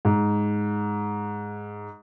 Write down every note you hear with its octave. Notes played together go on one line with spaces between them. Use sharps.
G#2